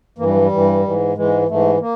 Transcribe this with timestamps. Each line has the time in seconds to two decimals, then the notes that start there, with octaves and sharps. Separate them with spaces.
0.18 G2 E3 A#3
0.27 G3
0.34 F#3
0.42 G3
0.51 G2 E3
0.84 G#2 E3
1.15 G#2 E3 G#3
1.48 G#2 E3 A3
1.80 A#3